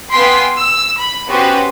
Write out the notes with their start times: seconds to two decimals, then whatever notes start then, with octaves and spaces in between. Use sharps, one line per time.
0.11 B3 F5 G5 G#5 C6 B6
0.57 E6
0.98 B5
1.29 B3 C#4 F#4 G4 B4 C5